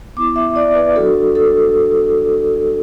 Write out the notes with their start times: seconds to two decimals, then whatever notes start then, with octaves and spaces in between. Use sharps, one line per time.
0.16 B3 E4 D6
0.36 E5
0.56 D5
0.76 B4
0.95 F#3 D4 F#4 A4
1.35 A4